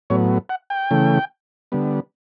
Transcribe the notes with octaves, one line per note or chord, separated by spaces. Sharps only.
A2 F#3 B3 C#5
F#5
G5
C#3 E3 A3
D3 G3 B3